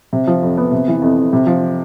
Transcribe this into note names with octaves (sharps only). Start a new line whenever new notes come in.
C3
F3
F2
B3
C3
E3
F2
F2
C3
F3